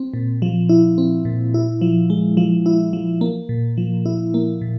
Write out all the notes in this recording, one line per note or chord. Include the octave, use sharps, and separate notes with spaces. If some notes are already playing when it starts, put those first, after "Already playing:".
Already playing: C4
A#2
F3
E4
C4
A#2
E4
F3
G#3
F3
E4
F3
A#3
A#2
F3
E4
A#3
A#2